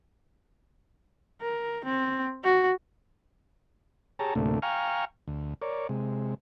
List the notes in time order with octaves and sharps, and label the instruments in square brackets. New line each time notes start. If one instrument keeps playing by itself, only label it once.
[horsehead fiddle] A#4
C4
F#4
[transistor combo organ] G4 G#4 C#5 A5 A#5
D2 A2 C3 A3 A#3 D4
F5 G5 G#5 A#5 C#6 F6
D2
A#4 C#5 D5
C3 G#3